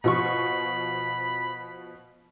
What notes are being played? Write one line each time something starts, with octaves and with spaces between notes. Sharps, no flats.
B2 F3 B5 C#6